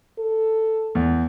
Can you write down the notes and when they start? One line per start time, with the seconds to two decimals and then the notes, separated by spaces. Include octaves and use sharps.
0.18 A4
0.95 E2